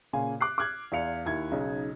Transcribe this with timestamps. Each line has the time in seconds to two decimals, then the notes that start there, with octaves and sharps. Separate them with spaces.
0.13 A#2 C#3 F5 G#5
0.41 D6 F#6 C7
0.58 D6 F6 F#6 G#6
0.92 E2 D5 F5 C#7 F7
1.26 D#2 E4 G#6
1.51 B1 C#3 D#4